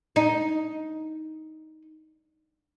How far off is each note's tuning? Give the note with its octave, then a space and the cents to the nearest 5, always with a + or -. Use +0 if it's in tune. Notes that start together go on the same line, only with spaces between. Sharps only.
D#4 +10